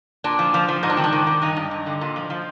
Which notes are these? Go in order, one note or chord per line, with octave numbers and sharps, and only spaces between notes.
A#2 D4
F3
F3
F3
G#2 D#4
D4
D#3 C4
D4
D#3
D#3
G2 D#4
G2
G2
D3
A#2
F3
F3